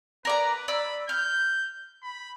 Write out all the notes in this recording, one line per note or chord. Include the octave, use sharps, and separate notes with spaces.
A#4 B4 D5 A#5
D5 B5 E6
F6 G6
B5